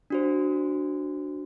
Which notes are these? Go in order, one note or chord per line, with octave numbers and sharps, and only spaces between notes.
D4 F#4 C5